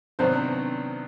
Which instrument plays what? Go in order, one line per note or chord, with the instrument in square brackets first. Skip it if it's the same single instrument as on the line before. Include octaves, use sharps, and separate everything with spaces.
[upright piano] C3 D#3 F#3 B3 D4 [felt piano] C5